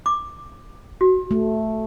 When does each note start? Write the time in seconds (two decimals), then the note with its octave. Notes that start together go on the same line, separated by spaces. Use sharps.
0.06 D6
1.01 F#4
1.31 A3